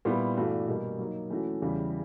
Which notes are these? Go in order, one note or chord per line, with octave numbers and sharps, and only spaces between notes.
A#2 G3 B3 E4
G2 E3 A3 D4 F#4
B2 G3 A#3
F#3 A#3 D#4
E3 A3 C#4 F#4
E2 C#3 E3 G3